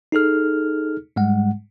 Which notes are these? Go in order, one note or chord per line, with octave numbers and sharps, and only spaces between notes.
D#4 G#4 A4 F6
G#2 G3 G#3 F#5